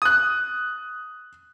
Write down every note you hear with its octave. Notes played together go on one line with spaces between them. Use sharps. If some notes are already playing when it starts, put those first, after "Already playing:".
D#6 F#6